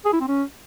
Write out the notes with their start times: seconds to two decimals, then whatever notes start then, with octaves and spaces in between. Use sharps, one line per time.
0.05 G#4
0.13 E4
0.20 C4
0.28 C#4